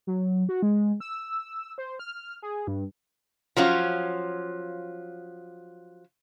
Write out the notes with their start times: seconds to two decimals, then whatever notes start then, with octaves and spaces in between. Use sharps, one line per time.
0.07 F#3
0.49 F#4
0.63 G#3
1.00 E6
1.78 C5
1.99 F6
2.42 G#4
2.67 G2
3.57 F3 F#3 C#4 F4